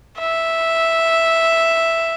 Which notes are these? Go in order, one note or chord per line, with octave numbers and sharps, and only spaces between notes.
E5